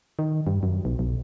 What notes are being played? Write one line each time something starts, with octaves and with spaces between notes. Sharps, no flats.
D#3
G2
F#2
B1
B1